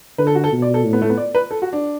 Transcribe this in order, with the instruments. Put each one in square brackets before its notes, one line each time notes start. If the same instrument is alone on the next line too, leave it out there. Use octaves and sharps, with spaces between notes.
[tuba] D3 [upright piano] B4
[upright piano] A4
F#4
A4
[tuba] B2
[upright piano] D5
A4
[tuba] A2
[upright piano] B3
A3
B3
D5
B4
A4
F#4
D4